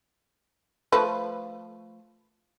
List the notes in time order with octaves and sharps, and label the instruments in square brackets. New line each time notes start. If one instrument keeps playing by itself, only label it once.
[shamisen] F3 A3 B4